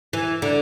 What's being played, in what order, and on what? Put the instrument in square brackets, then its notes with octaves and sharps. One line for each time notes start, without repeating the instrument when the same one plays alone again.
[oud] E3
D3